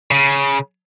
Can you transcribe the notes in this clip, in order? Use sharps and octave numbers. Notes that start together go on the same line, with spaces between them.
C#3